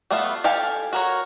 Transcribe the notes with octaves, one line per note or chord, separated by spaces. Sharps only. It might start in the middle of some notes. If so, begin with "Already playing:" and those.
G3 A3 B3 F4 E5
G4 A4 F5 G5 G#5
F#4 A#4 C#5